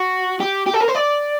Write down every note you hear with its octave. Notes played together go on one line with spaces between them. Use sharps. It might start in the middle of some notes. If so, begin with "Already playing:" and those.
Already playing: F#4
G4
G4
A4
A#4
C5
D5